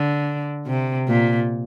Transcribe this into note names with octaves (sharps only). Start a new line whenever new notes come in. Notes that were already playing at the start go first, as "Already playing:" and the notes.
Already playing: D3
C3
A#2